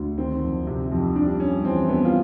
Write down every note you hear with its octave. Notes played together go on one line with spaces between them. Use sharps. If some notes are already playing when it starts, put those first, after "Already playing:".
Already playing: D2
D#3 C4
F2
C3
F2
G3 D4
G2 C#4
E3 C4
G2 B3
F4